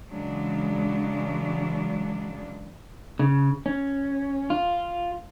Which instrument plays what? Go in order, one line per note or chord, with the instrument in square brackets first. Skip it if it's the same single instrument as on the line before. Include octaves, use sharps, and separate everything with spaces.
[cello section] C#3 E3 F#3 G#3 D4
[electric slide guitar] C#3
C#4
F4